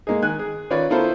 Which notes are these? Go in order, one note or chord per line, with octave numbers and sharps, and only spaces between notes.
G#3 A#3 D#4 G#4
D#3 G#5 F#6
G#4
D#3 C#4 F4 B4 C#5 D5
B3 E4 F4 A4 A#4 C5